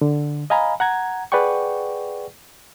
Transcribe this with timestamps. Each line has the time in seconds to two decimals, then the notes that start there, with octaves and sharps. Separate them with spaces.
0.01 D3
0.50 D#5 F5 G#5 A#5 B5
0.80 F#5 A#5 G#6
1.32 G#4 B4 D5 F#5 G5 C#6